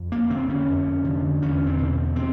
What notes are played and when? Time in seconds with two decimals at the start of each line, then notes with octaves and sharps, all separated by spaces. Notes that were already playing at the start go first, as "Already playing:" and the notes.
Already playing: F2
0.12 A#3
0.30 D3 C4
0.50 C#4
0.68 F2
1.04 D3
1.42 E2 C#4
1.66 C4
1.78 B2
2.16 C4